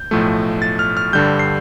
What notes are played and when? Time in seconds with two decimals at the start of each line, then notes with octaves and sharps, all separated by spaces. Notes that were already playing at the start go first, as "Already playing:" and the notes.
Already playing: G6
0.11 B1 A2 F3 A3
0.62 A6
0.79 F6
0.97 F6
1.13 G2 D3 G3 G6
1.39 C7